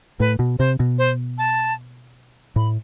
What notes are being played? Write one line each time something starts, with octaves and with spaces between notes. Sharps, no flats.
A2 B4
B2
C3 C5
B2
C5
A5
A2 B5